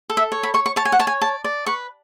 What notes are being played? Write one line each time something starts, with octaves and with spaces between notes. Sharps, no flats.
A4
E5
C#5
B5
C#5 C#6
C#6
C#5 A5
G#5
F#5
C#5 A5
G#5
D5 A5
D5
B4 C#6